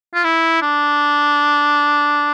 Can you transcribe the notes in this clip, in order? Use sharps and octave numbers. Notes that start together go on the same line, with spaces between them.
F4
E4
D4